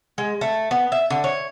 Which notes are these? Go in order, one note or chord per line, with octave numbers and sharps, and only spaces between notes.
G#3
A3
B3
E5
D3
C#5